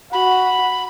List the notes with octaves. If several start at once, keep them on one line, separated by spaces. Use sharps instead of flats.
F#4 B5